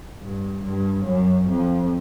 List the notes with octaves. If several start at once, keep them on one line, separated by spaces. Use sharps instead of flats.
G2
G2
F#2
F2